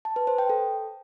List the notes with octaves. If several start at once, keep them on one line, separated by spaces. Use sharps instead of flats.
A5
B4
C5
G5
A4